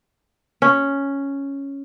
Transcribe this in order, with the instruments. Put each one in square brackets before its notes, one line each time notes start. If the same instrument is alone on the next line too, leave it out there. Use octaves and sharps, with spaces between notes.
[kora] C#4